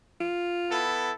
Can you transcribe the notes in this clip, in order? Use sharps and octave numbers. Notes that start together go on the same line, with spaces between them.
F4
B3 E4 A4